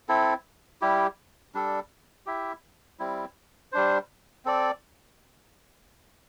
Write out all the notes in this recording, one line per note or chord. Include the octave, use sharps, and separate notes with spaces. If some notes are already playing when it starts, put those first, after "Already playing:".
C4 E4 A4
G3 E4 G4
G3 D4 A4
E4 G4 E5
G3 C4 E4
G3 D4 C5
C4 A4 D5